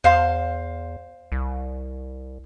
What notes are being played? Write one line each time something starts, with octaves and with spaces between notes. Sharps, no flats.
E2 C5 F5 C6
C2